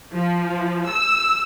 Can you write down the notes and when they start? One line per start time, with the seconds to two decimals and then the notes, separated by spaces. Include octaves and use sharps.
0.11 F3
0.86 E6